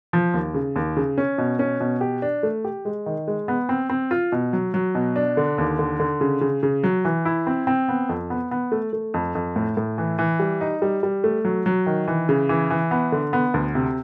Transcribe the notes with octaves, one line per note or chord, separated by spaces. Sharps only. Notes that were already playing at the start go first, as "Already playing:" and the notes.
F3
D#2
C#3
D#2
C#3
C#4
B2
C#4
B2
G4
D4
A3
G4
G#3
D#3
G#3
B3
C4
C4
F4
B2
F#3
F#3
B2
D4
D3
D#2
D3
D3
C#3
C#3
C#3
F#3
E3
E4
C4
C4
B3
F2
B3
B3
A3
A3
F2
F2
A2
A2
E3
E3
G3
D#4
G3
G3
A3
F#3
F#3
D#3
E3
C#3
E3
E3
B3
D3
B3
D2
C3